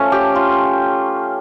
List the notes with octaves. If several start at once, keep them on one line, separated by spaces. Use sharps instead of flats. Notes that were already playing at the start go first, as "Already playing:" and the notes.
Already playing: F3 A3 C#4
G4
F4